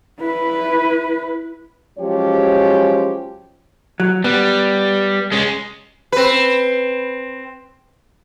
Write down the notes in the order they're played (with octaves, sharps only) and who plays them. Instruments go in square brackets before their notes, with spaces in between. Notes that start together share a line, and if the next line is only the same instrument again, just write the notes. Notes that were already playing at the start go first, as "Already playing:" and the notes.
[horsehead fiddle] E4 B4
[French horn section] F3 F#3 G#3 C#4 G4 C#5
[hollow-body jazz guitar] F#3
[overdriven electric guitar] G3 [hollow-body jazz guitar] B3
[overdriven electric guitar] G#3 C#4
[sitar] C4 B4